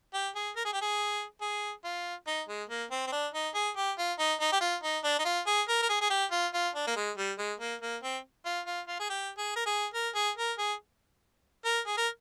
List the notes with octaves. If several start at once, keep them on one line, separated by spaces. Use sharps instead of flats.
G4
G#4
A#4
G#4
G4
G#4
G#4
F4
D#4
G#3
A#3
C4
C4
D4
D#4
G#4
G4
F4
D#4
D#4
G4
F4
D#4
D4
D#4
F4
G#4
A#4
A#4
G#4
G#4
G4
F4
F4
D4
A#3
G#3
G3
G#3
A#3
A#3
C4
F4
F4
F4
G#4
G4
G#4
A#4
G#4
A#4
G#4
A#4
G#4
A#4
G#4
A#4